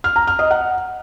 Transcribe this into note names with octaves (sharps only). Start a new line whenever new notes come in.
F6
A#5
F6
D#5
F#5